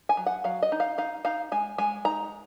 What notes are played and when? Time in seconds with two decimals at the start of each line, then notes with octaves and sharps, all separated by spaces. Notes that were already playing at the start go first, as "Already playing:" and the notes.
0.09 G#5
0.17 F#3
0.26 F#5
0.44 F#3 F5
0.63 D#5
0.72 D#4
0.80 F5
0.98 D#4 F5
1.25 D#4 F5
1.52 G#3 G#5
1.78 G#3 G#5
2.05 D#4 A#5